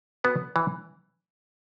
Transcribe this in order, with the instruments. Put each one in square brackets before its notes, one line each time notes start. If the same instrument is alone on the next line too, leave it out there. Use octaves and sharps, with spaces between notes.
[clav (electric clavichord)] B3 F#4 B4
E3